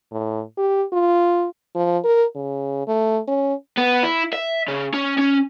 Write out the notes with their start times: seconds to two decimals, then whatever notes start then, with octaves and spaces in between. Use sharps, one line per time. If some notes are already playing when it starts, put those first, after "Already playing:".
0.11 A2
0.57 G4
0.93 F4
1.75 F3
2.04 A#4
2.35 C#3
2.88 A3
3.28 C#4
3.78 B3
4.03 E4
4.33 E5
4.68 C#3
4.94 C#4
5.18 C#4